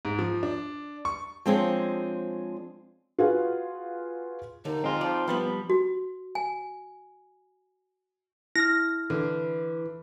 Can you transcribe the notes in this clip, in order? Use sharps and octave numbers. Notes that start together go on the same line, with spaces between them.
G#2
F3
D4
C#6
F3 G#3 C4 D4 G#4 C#5
F4 F#4 G#4 B4 F5 F#5
D#2 D3 D#4
G#3 C4 F4
F3 D5
F3 G3 B3 B4
F#4
G#5
E4 F6 A#6
D3 E3